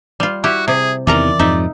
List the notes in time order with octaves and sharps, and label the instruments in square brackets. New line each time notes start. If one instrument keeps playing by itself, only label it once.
[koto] G3 F4
[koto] E4 G4 [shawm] F#4
[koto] C3 [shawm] G#4
[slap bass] E2 C3 D#3 [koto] E3 A#4 A#5 [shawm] D5
[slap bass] F2 G#2 [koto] D#4 E5